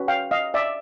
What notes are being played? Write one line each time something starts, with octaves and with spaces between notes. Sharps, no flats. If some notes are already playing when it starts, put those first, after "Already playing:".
Already playing: C#4 F#4 B4
F5 G5
D#5 F5
D5 E5